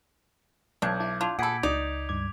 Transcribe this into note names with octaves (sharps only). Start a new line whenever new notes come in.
B1 D4 D6 G6 G#6
E4 A5 D6
D4 F4
A#2 G#4 A4 F#5 B5 G#6 B6 D7
C#2 D#4 D5 F7
C#2 G2 D6 G#6